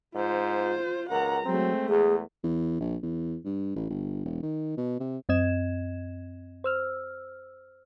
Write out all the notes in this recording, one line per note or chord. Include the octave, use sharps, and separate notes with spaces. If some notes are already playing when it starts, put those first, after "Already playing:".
G#2 F4 C5
C#2 A#4 F#5 A#5
F#3 G#3 A3 C4
E2 G#4
E2
A#1
E2
G2
A1
G1
E1
D#3
B2
C3
F#2 C4 D#5 G#6 E7
C5 E6 F6